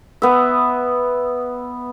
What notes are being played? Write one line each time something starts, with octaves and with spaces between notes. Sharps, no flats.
B3 E5